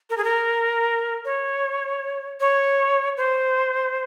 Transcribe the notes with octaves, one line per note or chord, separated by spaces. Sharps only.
A#4
G#4
A#4
C#5
C#5
C5